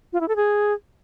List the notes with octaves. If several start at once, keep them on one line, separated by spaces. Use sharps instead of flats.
F4
E4
A4
G#4